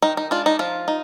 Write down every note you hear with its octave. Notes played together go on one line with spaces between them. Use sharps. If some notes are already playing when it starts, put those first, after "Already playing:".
D#3 D#4
D#4
G#3 D4 F4
D#4
F3 F4
D#4